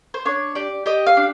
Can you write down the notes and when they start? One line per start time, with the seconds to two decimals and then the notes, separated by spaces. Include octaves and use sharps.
0.14 C5
0.25 D4 C#5
0.55 G4 D5
0.86 G4 D#5
1.06 F5
1.17 D4